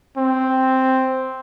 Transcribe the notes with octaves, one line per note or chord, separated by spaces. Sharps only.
C4